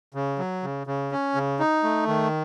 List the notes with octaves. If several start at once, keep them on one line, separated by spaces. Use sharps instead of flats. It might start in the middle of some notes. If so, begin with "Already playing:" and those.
C#3
F#3
C#3
C#3
C#4
C#3
D#4
A3
D#3